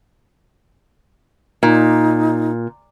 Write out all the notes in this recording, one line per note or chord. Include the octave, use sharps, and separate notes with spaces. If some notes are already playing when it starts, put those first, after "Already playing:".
A#2 D#4